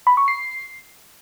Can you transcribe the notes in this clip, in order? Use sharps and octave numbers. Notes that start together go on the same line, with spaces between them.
B5
C#6
C7